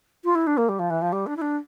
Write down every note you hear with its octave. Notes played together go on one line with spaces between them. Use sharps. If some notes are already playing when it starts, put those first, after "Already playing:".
F4
E4
D4
A#3
G3
F3
E3
F3
G3
D4
E4
D4